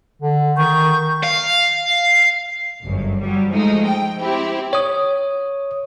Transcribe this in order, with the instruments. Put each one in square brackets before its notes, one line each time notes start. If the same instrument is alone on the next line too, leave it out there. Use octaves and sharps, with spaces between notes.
[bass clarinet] D3
[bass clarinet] D#3 [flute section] C#6 G6
[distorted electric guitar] F5
[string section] G1 F#2
F#3 G3
F3 G#3 A3 D#4
G5
C4 E4 G4
[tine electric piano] C#5 D#6